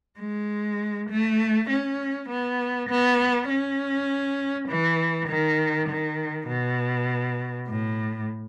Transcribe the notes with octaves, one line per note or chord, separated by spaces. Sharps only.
G#3
A3
C#4
B3
B3
C#4
E3
D#3
D#3
B2
A2